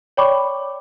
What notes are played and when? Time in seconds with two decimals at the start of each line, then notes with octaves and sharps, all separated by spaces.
0.17 C#5 D5 G5 B5 C#6 D6